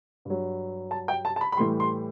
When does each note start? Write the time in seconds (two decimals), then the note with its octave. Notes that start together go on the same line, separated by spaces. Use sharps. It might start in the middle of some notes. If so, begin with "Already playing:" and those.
0.25 G2 F#3
0.91 A5
1.08 G5
1.25 A5
1.36 A5
1.41 B5
1.52 B5
1.57 A2 E3 G3 C6
1.80 C6